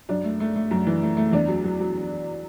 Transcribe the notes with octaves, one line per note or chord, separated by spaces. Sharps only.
F#2 D4
A3
A3
A3
F#2
E3
A3
A3
E2 D4
F#3
F#3
F#3